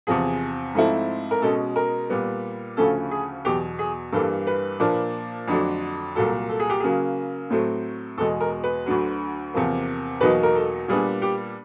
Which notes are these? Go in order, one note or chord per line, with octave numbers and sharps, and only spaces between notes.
E2 C3 F3 G#4
G#2 F3 A3 C4 E4
A#4
B2 G#3 C#4 A4
A#4
A#2 G3 B3
D2 C#3 F3 A3 C#4 A4
G#4
E2 B2 F#3 G4
G#4
G2 E3 G3 A#3 A4
B4
A#2 F3 A#3 D4
F2 D3 F#3 A3 D4
C2 A#2 F#3 A4
A4
G#4
G4
C#3 F#3 A#3 G#4
A2 F#3 A3 C4
E2 B2 G#3 A4
A#4
B4
D2 D3 F#3
E2 C3 F3 A#3
E2 B2 F#3 A#3 D#4 B4
A#4
A4
A#2 G3 B3 D4 G#4
G4